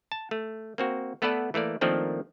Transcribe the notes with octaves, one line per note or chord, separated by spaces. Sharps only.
A5
A3
A#3 C4 F#4
A3 B3 A4 B4 D5 F#5
E3 A3 A#3 D5
D#3 F3 A3 A#3 C4 D4